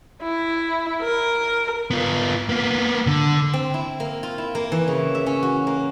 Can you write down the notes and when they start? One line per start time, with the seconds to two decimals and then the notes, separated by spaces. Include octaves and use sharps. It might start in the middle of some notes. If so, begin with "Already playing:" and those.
0.23 E4
1.02 A#4
1.91 B3 F4
2.49 A#3 B3
3.07 D3
3.53 C4
3.74 E4
4.00 A#3
4.23 F4
4.38 E4
4.55 A#3
4.72 E3
4.88 C#3
5.15 E5
5.26 C#4
5.43 F#4
5.67 A#3